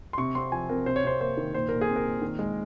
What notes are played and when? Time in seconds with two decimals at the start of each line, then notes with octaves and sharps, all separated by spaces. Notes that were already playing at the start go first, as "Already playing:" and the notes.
0.13 C6
0.18 C3 C#6
0.35 C4 C6
0.52 F3 G#5
0.70 C4 A#4
0.86 C3 C5
0.96 C#5
1.04 C3 C5
1.20 A#3 C5
1.37 D#3
1.54 A#2 C5
1.69 A#2 A#4
1.81 G#4
1.88 C4
1.96 A#4
2.05 A#2
2.22 D#3
2.39 G#3